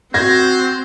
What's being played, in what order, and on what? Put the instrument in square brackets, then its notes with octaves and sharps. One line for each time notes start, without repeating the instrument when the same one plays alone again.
[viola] C4 [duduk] F#4 [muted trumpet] C5 [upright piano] G#6 A#6